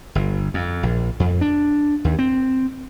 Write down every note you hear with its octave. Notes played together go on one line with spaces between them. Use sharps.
G1
F2
A#1
F2
D4
D#2
C4